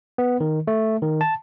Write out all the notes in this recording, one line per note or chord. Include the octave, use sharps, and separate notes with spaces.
B3
D#3
A3
D#3
A5